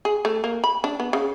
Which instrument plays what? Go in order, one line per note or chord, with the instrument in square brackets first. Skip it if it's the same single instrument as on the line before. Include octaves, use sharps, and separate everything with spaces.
[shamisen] G#4
A3
A#3
B5
D4
B3
C#3